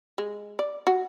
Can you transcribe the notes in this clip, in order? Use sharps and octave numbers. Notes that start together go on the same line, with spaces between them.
G#3
D5
F#4